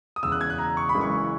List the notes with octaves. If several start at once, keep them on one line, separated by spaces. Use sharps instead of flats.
D#6
E1 E2 C#3 E6
F#6
G#6
F#6
A#5
C#6
B5
F#1 F#2 C#3 E3 G#3
C#6